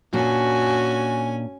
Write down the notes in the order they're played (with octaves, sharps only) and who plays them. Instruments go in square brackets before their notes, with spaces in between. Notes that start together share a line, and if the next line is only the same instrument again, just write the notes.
[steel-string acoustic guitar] A#2 D4 [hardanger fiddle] C#4 G#5 [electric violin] F#4